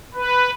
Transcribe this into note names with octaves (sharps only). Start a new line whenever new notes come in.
B4